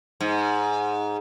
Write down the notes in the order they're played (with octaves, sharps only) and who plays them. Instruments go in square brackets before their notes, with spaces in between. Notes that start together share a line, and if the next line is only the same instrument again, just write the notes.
[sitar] G#2